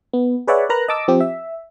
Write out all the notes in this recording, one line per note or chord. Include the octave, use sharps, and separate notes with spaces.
B3
G#4 B4 C#5 D5 E5 F#5
A#4 B4 A#5 F#6
D#5 A5 D6 E6
F3 C4 G4
E5